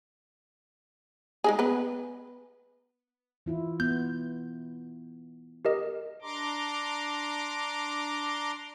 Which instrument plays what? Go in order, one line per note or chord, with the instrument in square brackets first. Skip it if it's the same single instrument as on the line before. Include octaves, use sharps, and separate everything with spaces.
[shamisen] G#3 D#4 G#4
B3 B4
[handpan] E3 E4 F4
[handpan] B3 [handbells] G6
[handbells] G4 A#4 D#5
[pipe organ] D4 A#5 C6 D6